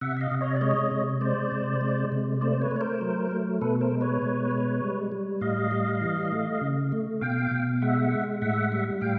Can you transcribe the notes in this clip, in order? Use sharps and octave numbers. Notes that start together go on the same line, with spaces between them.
C3 E5 F#5
E5
D#5 F5
C3
C#5 D#5
D5
G#3 C#5 D#5
C3
G#3 C5 D5
C3
G#3
C3
A3 C5 D5
C5
B4 C#5
A3
C#5
A#4 C5
F#3
A3
B2 A4 B4
A#4 C5
G#3
B4 C#5
B2
G#3
G3
G3
A2 D#5 F5
G3
E3
A3
C#3
A3
B2 F5 G5
B2
G#3 E5 F#5
G#3
A2 E5 F#5
G3
A2 F5 G5